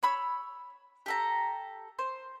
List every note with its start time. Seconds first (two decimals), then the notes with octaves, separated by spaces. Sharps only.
0.03 C#5 B5 E6
1.06 G4 A4 A#5
1.99 C5